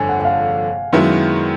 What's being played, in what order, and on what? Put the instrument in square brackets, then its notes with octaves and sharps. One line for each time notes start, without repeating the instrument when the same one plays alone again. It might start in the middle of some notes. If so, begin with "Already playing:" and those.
Already playing: [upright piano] G1 F2 D3 [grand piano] G#5
[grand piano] F#5
F#5
F5
[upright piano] F#2 D#3 G#3 B3 E4